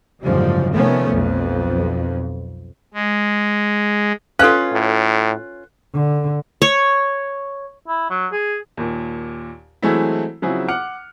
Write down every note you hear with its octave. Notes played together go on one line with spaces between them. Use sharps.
F#1 G#2 D3 F3 G3
C3 D#3 F3 A3 B3 C#4
B1 F2
G#3
C#4 F4 A4 B4 F5 F#6
A2
D3
C#5
E4
F#3
G#4
D#2 A#2
E3 F#3 G#3 A3 C4 E4
C#3 F3 F#3 C4 E4 G#4
F#5 D6 F6 F#6 C#7